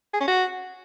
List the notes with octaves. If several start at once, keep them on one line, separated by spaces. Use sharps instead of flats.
G#4
C#4
F#4